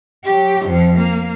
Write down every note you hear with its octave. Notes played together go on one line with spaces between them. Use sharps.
F#3 G4
F2 F3
A#3